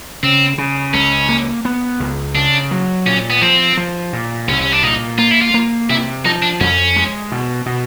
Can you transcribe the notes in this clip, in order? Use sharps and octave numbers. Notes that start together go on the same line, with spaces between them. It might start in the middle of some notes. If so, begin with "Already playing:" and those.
C#3 C4
C#3
C#2 C#4
A#3
B3
C#2
C#3 D4
F#3
A#2 C#4
B3
F3 C4
F3
A#2
C2 C#4
C#4
D4
A#2 D#4
A#3 F4
E4
F4
A#3
C3 E4
F3 D#4
D4
F2 C#4
G#3
B2
B2